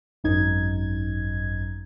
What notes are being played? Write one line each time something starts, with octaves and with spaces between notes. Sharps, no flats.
G#1 F#2 D#4 G#6